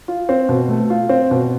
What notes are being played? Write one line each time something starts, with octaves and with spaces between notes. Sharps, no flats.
F4
C4
B2
A3
F4
C4
B2